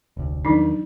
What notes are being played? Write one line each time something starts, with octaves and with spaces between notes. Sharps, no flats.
F1 D2
E2 D#3 F3 F#3 D4 D#4